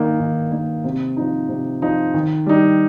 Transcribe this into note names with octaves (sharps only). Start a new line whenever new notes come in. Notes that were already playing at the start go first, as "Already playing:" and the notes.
Already playing: D#3 A#3 D#4
D#3
A#3 D#4
C3
F3 D#4
C3
F3 D#4
D#3
G3 D#4